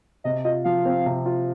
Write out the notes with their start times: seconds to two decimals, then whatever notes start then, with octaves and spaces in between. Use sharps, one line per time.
0.24 C3 D#5
0.44 F4 D#5
0.64 F3 F5
0.85 C4
1.06 C3
1.26 F4